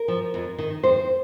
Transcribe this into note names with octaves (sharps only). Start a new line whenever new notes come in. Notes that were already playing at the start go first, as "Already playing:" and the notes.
Already playing: A#4
F3
F2
D#3
F2 C5